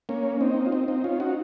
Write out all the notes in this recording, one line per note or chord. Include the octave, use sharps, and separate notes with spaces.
A#3 C#4
C4 D#4
F4
C4 D#4
C4 D#4
C#4 F4
D#4 F#4